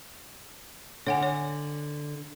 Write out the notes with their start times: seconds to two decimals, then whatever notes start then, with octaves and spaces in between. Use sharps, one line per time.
1.07 D3 C#5 F#5 G#5
1.23 C#5